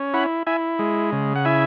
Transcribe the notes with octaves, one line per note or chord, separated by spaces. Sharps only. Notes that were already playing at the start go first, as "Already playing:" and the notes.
Already playing: C#4
E4 F#5 B5
E4 E5 G#5
G#3
C#3
F#5
E4 E5 G#5